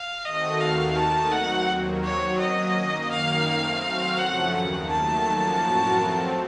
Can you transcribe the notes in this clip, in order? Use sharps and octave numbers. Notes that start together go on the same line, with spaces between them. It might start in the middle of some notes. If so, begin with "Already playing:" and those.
Already playing: F5
D#3 A3 C4 F#4 A4 D#5
D#2 D#3 A#3 D#4 F#4 F5
A3 D#4 A#4 A5
F#3 C4 F#4 F#5
D#2 D#3 F#3 A#3
F#3 C4 F#4 C#5
F#3 A#3 C#4 D#5
F#2 D#3 A#3
F#2 D#3 A#3 F5
A3 C4 D#4
F#3 C4 F#4 C5
F#2 C#3 F3 A3 C#4 F#5
D#2 D#3 A#3 F#5
D#3 F#3 A3 A5
F#2 F3 A#3 C#4 F#4
A2 F#3 C4 F#4 A#4
F3 A3 C4